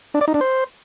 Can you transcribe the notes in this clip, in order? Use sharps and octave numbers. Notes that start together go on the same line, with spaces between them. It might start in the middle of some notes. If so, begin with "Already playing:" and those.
D4
D5
D#4
D4
C5